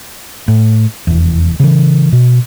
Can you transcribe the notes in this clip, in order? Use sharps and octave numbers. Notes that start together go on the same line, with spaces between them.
A2
F1 E2
C#3 E3
B2